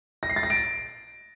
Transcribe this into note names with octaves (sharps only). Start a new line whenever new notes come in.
A#6
C7
A6
A#6
D7